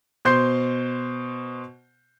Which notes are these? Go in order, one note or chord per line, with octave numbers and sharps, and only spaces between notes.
B2 C5 C6 G6 C7